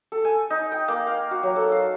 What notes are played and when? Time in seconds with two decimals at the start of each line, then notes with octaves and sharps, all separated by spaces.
0.12 A4
0.25 G#5
0.50 D#4
0.72 G5
0.88 A#3
1.07 F5
1.31 F#4
1.43 F#3
1.56 A4
1.72 F5